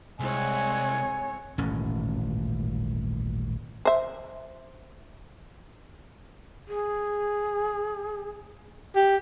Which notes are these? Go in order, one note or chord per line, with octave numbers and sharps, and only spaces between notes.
C2 G#3 C4 C#5 F#5 G#5
D#1 A1 G#2 C#4
C5 E5
G#4
G4